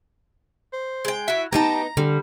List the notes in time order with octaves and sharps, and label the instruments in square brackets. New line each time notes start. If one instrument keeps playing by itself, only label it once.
[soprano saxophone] C5
[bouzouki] G#3 G5
[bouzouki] E4 F#4 [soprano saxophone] E5
[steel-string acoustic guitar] B3 D#4 [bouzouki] G4 B4 A5 [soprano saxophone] A#5
[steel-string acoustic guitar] D3 [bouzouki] G3